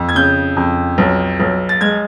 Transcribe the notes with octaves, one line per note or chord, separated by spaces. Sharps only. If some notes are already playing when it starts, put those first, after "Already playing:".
Already playing: F2
G#6
C#3 G6
F2
B1
B1
A6
G#3 G#6